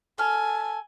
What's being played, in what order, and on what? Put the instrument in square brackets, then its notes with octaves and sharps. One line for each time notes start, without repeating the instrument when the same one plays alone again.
[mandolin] A4 F6 [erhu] G#5